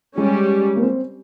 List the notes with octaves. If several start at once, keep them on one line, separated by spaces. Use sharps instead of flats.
G3 G#3 C#4 G4
A#3
C4